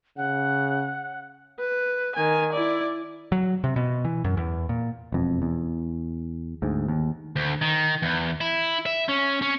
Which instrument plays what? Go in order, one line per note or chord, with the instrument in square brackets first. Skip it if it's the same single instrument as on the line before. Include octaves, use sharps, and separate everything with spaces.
[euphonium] C#3 [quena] F#5
[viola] B4
D#3 G#5
E4 D5
[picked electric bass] F#3
C3
B2
E3
F#2
E2
A#2
E1 F2
E2
D2 G#2
D#2
[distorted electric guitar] D2
D#3
E2
E4
E5
C#4
C#4